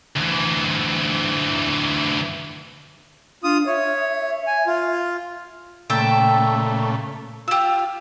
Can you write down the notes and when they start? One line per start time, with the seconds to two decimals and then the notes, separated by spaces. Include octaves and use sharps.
0.16 D2 E3
3.44 D4 F4 D#6
3.67 C#5 E5
4.47 G#5
4.67 F4
5.90 A#2 C#3 A3 E5 G5 A5
7.48 F4 G4 E6